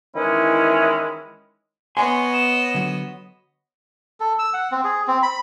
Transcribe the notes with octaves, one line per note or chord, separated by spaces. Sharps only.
D#3 E3 G#3 C#4 E4
B3 C#5 D#5 G#5 C6
E7
D3 F#3
A4
E6
F#5
C4
G#4
C4
B5